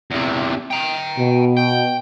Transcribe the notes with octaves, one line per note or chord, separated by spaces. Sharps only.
E2 C3
G5 A#5
B2
G5